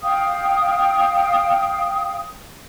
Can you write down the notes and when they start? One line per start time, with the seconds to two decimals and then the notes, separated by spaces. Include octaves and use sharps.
0.03 F5 G5 D#6